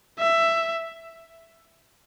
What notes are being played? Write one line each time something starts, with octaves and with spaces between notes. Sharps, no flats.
E5